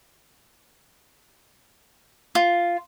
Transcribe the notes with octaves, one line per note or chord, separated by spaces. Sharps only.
F4